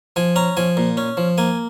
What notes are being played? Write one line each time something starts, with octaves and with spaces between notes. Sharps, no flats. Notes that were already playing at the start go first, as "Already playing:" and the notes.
F3 G#5
C#4 A#5
F3 G#5
A#2
C#4
F3
A#3 G#5